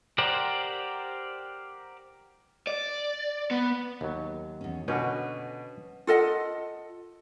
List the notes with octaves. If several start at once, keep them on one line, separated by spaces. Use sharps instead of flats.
G4 A#4 C5 D5 F#5
D5
B3
D#2 F#3
E2 C#4
B2 D3 C#4 F#4 B4 G5
F4 A4 D#5 F#5